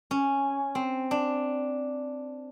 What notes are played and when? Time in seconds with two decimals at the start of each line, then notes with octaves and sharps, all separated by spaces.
0.11 C#4
0.75 C4
1.11 D4